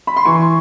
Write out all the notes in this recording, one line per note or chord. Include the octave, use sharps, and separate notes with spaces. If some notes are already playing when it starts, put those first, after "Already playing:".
B5
C6
E3 C#6